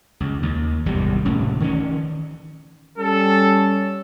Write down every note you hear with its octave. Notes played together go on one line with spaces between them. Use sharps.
C#2
D#2
G#1 E2 C3 G3
F1 C#2 A2 C#4
D#3 E3 C#4
G3 C#4 A4